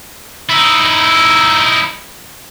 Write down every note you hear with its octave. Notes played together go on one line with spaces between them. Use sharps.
D#4 E4